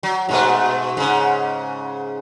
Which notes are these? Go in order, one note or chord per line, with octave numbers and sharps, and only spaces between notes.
F#3
G#2 B2 A3
G#2 C#3